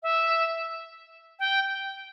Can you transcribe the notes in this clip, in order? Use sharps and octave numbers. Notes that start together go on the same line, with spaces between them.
E5
G5